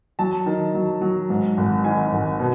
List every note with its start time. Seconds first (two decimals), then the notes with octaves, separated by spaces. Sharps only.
0.19 F#3 A5
0.46 D#3
0.75 F#3
1.01 F#3
1.30 G#2
1.58 G#1
1.84 D#3 G#5
2.12 G#1
2.39 B2